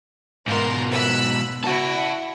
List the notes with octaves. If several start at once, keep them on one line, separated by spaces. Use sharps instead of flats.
G#2 B2 F4 A#4 C6
B5 E6 F#6
E4 F#4 F#5 A5